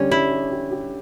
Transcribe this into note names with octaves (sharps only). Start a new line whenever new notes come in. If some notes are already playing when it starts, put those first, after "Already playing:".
Already playing: D3 G3 C#4 D4
G3 E4
G4
G4
G4